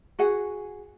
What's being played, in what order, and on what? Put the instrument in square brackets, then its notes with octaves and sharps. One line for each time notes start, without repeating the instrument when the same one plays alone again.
[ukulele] F#4 G#4 F#5